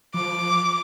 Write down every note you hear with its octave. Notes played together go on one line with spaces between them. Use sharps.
F3 D6